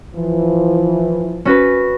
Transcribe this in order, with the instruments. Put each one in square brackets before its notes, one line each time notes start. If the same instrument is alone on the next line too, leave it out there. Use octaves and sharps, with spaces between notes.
[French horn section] E3 F3
[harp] C#4 F#4 B4